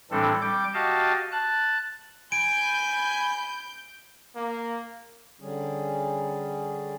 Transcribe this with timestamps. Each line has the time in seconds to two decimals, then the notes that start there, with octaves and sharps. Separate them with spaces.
0.11 A2 E3 G3 C4 D4 A4
0.42 G3 D6 G6
0.74 F#4 G4 D#5 F5 A5
1.32 A5 F#6
2.32 G#5 B5 G6 D7
4.35 A#3
5.40 D3 G3 C#4 G#4